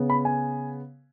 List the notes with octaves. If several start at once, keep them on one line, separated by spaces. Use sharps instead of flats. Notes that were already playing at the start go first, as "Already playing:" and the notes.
Already playing: C#3 B3
B5
G#5